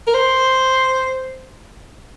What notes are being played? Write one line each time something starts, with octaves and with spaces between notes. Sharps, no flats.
A#4
C5